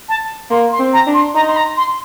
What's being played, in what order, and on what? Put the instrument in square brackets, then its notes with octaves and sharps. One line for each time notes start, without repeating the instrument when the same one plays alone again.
[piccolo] A5
[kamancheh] A#3 [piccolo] C6
[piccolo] C6
[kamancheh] C4
[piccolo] A#5
[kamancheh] D4
[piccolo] C6
[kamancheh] D#4 [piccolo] A#5
[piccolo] C6
A#5
C6